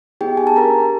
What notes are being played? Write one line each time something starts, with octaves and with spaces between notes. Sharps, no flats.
B3 D#4 G4 G#4 G5
G#5
A5
D4 G4 A#4 A#5